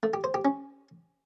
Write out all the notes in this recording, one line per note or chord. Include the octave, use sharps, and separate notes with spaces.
A3
G4
C5
G4
C#4